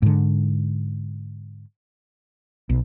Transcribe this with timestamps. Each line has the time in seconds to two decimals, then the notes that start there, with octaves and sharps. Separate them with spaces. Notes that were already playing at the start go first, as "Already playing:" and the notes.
0.02 G#2 D3
2.69 B1